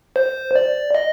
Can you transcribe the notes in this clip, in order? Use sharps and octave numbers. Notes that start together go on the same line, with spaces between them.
C5
D5
D#5